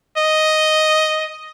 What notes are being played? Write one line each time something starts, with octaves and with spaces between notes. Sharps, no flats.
D#5